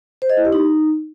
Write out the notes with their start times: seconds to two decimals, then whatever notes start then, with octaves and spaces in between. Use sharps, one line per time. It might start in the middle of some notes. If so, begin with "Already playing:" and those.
0.22 C5
0.30 D#5
0.37 E4
0.45 G4
0.53 D#4